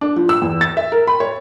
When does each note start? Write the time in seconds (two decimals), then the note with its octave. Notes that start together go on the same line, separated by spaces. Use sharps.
0.01 D4
0.16 F3
0.29 E6
0.42 E2
0.61 A6
0.77 E5
0.92 A#4
1.07 B5
1.20 C#5